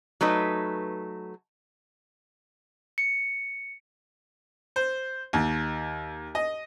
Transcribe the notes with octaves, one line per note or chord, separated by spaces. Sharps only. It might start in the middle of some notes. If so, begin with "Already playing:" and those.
F#3 A3 D#4 B4
C#7
C5
D#2
D#5